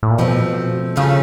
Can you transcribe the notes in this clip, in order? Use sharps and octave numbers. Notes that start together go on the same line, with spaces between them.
A2
A#2
B2 F3 A3 C4
C#3 F3 A3 C#4 F4 A4